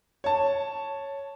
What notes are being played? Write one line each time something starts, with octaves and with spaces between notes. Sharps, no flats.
C#5 A5